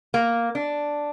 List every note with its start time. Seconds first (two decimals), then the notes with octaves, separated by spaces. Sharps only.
0.14 A#3
0.55 D4